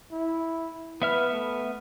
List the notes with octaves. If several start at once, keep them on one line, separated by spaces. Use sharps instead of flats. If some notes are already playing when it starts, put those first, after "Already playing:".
E4
B3 B4 E5 F6
A3